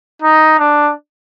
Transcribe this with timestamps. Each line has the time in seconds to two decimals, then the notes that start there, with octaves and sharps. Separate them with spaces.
0.22 D#4
0.59 D4